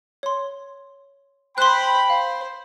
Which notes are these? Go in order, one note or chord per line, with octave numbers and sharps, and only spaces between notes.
C#5 C6
C5 G5 B5 C6 F#6
C5 F5